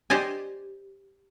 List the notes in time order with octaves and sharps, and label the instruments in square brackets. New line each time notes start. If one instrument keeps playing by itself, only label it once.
[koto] G4 C5 D5 D#5 G#5